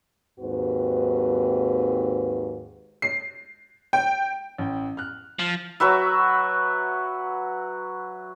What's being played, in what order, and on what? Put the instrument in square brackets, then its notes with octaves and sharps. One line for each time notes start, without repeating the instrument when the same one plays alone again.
[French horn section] D#2 G#2 C4 F#4 B4
[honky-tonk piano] C7
G5
[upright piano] A1 G5
F6 F#6
[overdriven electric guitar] F3
[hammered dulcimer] F#3 F#4 B4 E5